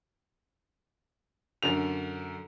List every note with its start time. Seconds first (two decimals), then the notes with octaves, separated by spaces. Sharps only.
1.63 F#2 D3 F7